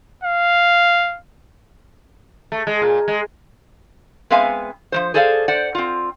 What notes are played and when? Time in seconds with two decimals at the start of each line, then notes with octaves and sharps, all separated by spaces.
0.24 F5
2.52 A3
2.67 G#3
2.82 A#2
3.08 G#3
4.30 G#3 B3 C4 E5 F5 G#5
4.92 F3 G#3 C5
5.14 G#4 A4 C5 D5 E5 F5
5.48 C5 D5 F#5
5.75 C4 F4